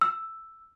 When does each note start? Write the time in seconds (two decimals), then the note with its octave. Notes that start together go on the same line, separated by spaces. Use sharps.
0.01 E6